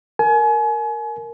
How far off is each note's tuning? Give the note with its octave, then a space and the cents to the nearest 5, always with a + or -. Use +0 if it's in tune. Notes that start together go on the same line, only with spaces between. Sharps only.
A#4 -10 G#5 +35